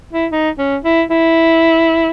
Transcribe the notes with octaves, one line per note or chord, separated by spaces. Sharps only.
E4
D#4
C#4
E4
E4